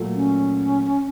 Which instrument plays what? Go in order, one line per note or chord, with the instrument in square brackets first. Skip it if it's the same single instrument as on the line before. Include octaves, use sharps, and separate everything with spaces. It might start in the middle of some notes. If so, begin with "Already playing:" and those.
Already playing: [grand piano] A#2 F#3 A3
[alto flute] C#4